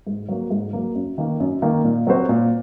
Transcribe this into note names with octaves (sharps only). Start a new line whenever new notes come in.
G#2
F#3 A#3
G#2
F#3 A#3
F#2
D#3 A#3
F#2
D#3 A#3
A#2
F#3 C4 F#4 C5
A#2